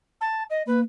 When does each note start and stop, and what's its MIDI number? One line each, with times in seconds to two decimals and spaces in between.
0.20 0.43 81
0.50 0.62 75
0.67 0.83 58
0.67 0.79 71